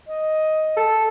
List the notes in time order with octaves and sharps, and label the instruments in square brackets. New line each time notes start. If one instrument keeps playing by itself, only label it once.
[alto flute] D#5
[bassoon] A4